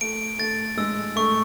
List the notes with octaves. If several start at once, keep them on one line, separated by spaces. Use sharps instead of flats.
A3 D7
A3 A6
G#3 E6
A3 C#6